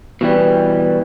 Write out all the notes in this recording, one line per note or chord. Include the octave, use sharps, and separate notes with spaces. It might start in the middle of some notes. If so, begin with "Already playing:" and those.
B2 E3 G3